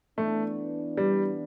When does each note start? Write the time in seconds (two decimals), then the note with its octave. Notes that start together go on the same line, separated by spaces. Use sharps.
0.17 E3 A3 B3 D4
0.97 G3